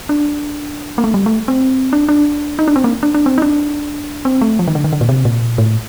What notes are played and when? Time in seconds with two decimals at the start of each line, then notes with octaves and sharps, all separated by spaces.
0.09 D4
0.98 A#3
1.04 A3
1.14 G3
1.26 A3
1.48 C4
1.93 D4
2.08 D4
2.59 D#4
2.68 D4
2.76 C4
2.84 A#3
3.03 D4
3.14 D4
3.26 C4
3.38 D#4
3.42 D4
4.25 C4
4.41 A3
4.59 F3
4.67 D#3
4.75 D3
4.84 D#3
4.92 D3
5.01 A#2
5.09 C3
5.25 A#2
5.58 A2